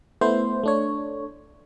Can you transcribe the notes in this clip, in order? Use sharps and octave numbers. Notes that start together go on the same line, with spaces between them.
A3 B3 E4 C5
A3 D4 C#5